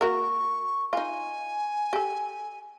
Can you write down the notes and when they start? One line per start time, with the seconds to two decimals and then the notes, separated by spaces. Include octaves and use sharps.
0.01 A#3 F#4 A#4 C#6
0.93 D#4 F4 G#5
1.93 G4 A4